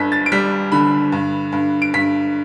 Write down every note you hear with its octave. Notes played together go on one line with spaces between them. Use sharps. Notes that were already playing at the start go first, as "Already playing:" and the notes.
Already playing: G1 G2 B6
A6
D7
G3 B6
D3 B5
G2
G2
D7
G2 B6